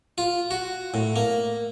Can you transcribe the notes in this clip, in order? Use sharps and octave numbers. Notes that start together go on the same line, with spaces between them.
F4
F#4
A2
A#3